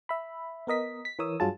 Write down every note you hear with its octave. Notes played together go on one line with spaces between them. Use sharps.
E5 B5
B3 A#4 D#5 B6
B6
E3 A#4 C#5 D#6 E6
G2 F#3 F4 G#4 A5